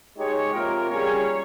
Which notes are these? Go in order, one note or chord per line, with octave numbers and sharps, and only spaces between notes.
G#3 D#4 G4 C#5
C3 F3 A#3 F4 A#4
G3 C#4 G#4 C#5